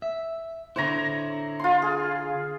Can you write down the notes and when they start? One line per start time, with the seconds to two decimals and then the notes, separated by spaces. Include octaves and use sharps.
0.02 E5
0.76 D3 E4 C5 C#5 A#5
1.60 F4 C6
1.82 G#4